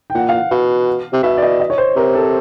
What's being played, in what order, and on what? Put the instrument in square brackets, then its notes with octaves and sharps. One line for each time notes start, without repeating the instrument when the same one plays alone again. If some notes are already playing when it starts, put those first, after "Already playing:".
[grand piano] G5
[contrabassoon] A#2 [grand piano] F#5
[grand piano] F5
F#5
[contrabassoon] B2 [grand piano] F5
[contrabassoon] C3
[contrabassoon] B2 [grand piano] E5
[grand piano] D5
D#5
D#5
C#5
C5
[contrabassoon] C3 [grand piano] A#4
[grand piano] A4